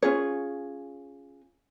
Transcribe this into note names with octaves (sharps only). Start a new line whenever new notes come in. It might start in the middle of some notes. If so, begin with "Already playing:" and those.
C#4 F4 G#4 C#5